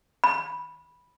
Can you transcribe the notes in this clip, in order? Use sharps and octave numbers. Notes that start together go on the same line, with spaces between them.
B5